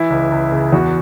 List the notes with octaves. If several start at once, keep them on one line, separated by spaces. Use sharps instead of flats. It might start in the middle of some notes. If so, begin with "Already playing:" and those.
Already playing: E3 E4
C#2
C#2
C#3
E2 F#4